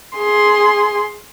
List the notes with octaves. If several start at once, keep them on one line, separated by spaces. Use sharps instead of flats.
G#4 C6